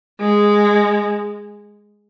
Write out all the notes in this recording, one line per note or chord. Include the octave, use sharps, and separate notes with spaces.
G#3